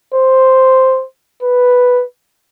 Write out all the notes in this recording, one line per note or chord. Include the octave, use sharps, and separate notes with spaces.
C5
B4